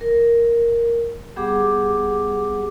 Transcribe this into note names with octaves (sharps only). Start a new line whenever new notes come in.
A#4
G3 B3 G4 G#4 F#5 D6